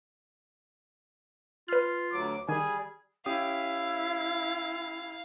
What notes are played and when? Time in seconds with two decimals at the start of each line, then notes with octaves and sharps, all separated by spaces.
1.68 F4 B4 F6
2.12 D2 F#3 D6
2.48 D#3 G3 G#4 G#5
3.26 C#4 E4 G4 F5 D#6